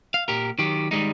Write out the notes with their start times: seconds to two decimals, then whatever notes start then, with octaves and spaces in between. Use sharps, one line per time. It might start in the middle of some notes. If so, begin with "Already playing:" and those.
0.14 F5
0.28 A#2 G4 A#4
0.59 D#3 F#3 G4
0.91 D#3 G3 G#3 D#4